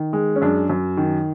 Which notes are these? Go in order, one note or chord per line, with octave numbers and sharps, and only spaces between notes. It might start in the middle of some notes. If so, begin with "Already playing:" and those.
Already playing: D#3
G#3
C#4
F#2 D4
F#2
D#3